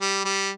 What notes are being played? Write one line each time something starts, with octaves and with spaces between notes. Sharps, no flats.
G3
G3